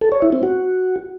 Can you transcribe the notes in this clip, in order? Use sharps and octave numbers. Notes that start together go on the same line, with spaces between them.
A4
C#5
E4
C4
F#4